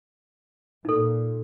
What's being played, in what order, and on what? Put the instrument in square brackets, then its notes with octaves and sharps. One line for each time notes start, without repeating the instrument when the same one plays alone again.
[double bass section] A#2 [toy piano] D#4 A4